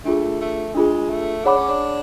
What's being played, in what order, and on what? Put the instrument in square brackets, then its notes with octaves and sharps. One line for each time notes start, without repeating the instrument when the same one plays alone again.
[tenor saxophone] A3 [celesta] D4 F4 G#4
[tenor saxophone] A3
[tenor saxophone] G#3 [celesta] D4 F4 G#4
[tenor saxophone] A3
[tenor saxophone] D4 [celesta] G#4 C#5 F#5 B5 D6
[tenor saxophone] C#4
D4